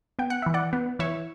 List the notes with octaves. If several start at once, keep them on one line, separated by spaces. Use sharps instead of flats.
B3 G5
F#5
E3 E5
D5 F#5
B3
E3 C#5 E5